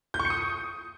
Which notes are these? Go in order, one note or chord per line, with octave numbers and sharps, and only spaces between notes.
G6
C#6
C#7
D#6